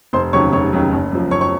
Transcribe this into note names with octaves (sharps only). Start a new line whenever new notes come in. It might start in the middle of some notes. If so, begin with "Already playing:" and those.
F1 C5 C6
D#2 C#3 F#3 C#5 C#6
F1 C#5 C#6
D#2 C#3 F#3
F#1
F#2 F3
F#1 C#5 C#6
C#5 C#6